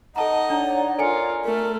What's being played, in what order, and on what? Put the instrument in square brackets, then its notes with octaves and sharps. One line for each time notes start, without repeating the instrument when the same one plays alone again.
[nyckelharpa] D#4 D#5 [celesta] A4 A5 A#5 [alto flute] F#5
[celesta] D4 [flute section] C#5 D5 A#5
[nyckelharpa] F4 A#4 [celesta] A4 G#5 C#7
[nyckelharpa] A3 [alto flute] A#4